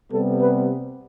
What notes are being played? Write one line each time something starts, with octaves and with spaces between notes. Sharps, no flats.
C3 G3 B3 A4
B4